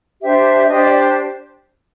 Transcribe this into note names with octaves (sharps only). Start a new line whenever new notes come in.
D4 G4 C5 E5
D4 G4 C5 D#5
D5